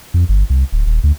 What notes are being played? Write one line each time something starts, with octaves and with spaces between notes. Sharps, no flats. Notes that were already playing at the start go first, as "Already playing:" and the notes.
F2
G1
C2
D1
D#1
D2